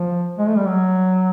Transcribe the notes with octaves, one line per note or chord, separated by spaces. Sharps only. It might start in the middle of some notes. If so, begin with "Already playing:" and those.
Already playing: F3
G#3
A3
G3
F#3